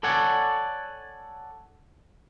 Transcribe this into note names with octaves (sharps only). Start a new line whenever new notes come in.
A4 C#5 D5 F#5 G#5